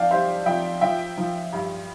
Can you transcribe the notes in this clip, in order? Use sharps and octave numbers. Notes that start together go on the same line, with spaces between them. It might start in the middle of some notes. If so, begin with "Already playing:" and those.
Already playing: F2 D5 E5 F5 G5 A5
G3 C5 E5
F2 E5 G5
F3 E5 G5
F3
G2